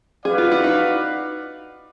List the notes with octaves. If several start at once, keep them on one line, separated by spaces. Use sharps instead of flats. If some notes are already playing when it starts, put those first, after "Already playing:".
F#4 G#4 B4 D5 F5
F4
E4
D#4